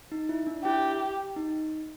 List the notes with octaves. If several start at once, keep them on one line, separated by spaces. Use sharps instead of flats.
D#4
E4
D4
E4 G4
D#4